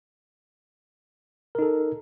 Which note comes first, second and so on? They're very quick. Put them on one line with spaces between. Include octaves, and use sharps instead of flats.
A#4 D#4 A4